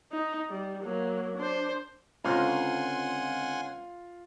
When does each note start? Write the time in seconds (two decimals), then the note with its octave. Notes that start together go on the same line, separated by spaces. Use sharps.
0.12 D#4
0.50 G3
0.83 F#3 A#3
1.38 D4 C5
2.24 C#2 D3 C4 F4 F#5 G#5 C6